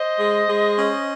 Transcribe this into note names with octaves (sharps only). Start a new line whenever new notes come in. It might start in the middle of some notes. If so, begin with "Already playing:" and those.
Already playing: C5 D#5
G#3
G#3
C#4